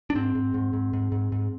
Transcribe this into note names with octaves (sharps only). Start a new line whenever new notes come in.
D4
G#2 C4
G#2
G#2
G#2
G#2
G#2
G#2